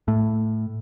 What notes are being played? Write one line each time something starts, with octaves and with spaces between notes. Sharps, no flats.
A2